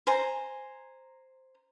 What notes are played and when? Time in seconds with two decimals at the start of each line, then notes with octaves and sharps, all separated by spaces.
0.07 C5 G#5 A#5